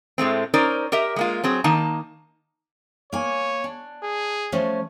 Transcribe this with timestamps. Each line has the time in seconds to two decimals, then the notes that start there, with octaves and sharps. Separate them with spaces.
0.18 A2 G#3 A3 C4
0.54 C#4 D#4 A#4 C5 D5
0.92 G4 A#4 D#5 E5
1.16 G#3 A#3 F4
1.43 F#3 C4 G#4
1.64 D#3 A#3 D#4 A5
3.13 A#3 C#5 G#5
3.64 D4
4.03 G#4
4.52 F3 A3 C#4